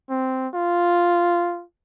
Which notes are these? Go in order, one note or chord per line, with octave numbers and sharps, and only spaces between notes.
C4
F4